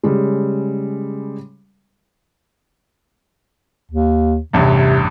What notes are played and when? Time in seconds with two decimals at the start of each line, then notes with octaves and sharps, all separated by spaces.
0.03 C#3 G3 G#3
3.91 D#2
4.53 A1 E2 G2 C3